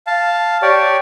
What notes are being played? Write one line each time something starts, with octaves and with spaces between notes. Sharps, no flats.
F5 A5
G4 C#5 D5